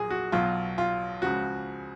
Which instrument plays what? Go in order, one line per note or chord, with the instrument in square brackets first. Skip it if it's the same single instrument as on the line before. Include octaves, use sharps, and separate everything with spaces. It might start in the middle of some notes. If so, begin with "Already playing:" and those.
Already playing: [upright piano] A#1 A#2 F#3 G#4
F#4
B1 B2 F#3 F4
F4
C#2 C#3 F3 F#4